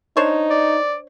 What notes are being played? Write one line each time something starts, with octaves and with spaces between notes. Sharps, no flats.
D4 D#4 C5 C#5
D5